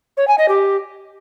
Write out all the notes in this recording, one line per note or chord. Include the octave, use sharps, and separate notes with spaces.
C#5
G#5
D#5
G4